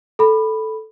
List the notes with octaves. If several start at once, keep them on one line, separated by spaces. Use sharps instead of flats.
A4 B5